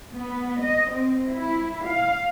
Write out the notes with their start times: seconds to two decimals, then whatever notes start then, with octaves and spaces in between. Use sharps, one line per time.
0.13 B3
0.61 D#5
0.92 C4
1.30 E4
1.86 F5